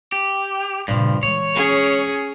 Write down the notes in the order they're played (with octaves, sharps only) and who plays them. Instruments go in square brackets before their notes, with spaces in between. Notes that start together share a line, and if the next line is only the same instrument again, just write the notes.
[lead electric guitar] G4
[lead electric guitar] G2 F3 [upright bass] A#2 C#3
[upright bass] E3 G#3 [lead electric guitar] C#5
[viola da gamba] C#4 G#4